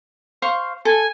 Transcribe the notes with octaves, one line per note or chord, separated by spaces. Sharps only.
C5 F5 C#6
A4 G#5